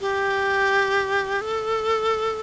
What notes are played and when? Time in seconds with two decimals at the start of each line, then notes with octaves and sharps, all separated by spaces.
0.01 G4
1.41 A4